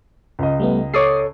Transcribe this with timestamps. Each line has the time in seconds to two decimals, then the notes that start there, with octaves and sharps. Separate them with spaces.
0.39 C#2 D#5
0.60 G3 A3 B3
0.94 A4 C#5 D6 D#6 C7